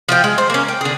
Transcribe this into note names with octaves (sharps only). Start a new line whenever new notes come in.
F3 F4 G5
G#3
C5
A#3 C#4
G5
D3 G#4